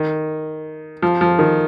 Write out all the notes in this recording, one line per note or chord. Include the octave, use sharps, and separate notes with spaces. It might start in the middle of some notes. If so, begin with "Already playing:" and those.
Already playing: D#3
F3
F3
D#3